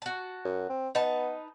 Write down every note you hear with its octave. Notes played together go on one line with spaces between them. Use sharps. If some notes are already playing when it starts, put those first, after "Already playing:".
F#4 A5
F#2
C4
B3 D#4 B4 A5